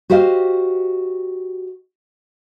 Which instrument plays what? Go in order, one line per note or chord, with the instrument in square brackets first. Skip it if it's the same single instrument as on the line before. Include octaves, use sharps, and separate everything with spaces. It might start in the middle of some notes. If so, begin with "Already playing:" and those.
[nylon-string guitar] F#4 G4 C5 D#5 F5